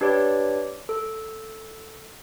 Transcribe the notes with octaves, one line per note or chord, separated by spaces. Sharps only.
D4 G4 B4 C#5 D5
A4